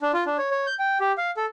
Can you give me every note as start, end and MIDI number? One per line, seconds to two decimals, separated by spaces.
0.01 0.12 62
0.13 0.24 65
0.26 0.37 62
0.38 0.51 73
0.51 0.66 73
0.66 0.74 91
0.79 0.98 79
1.00 1.12 67
1.18 1.31 77
1.37 1.45 69